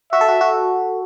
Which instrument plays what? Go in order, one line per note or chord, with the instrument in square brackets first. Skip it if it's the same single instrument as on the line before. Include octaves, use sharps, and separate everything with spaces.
[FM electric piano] F#4 [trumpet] E5
[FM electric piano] A4
F#4
F#4